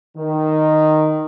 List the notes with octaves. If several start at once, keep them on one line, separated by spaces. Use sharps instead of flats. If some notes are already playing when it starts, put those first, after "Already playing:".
D#3